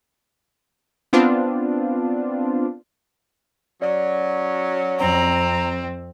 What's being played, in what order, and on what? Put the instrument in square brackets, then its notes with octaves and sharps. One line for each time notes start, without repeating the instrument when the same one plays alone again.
[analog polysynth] B3 C4 D4 F4
[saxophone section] F#3 C#4 [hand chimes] D5
[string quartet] F2 C4 [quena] A#5